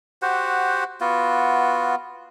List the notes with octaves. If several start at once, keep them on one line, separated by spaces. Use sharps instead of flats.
F#4 G4 C5 F#5
B3 F4 F#4